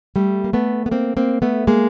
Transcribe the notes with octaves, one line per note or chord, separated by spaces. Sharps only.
G3 A3
A#3
A3 B3
B3
A#3 C4
A#3 C4
A3 B3
G#3 A#3